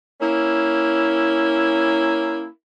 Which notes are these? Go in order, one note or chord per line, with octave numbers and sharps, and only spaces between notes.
A#3 C#4 E4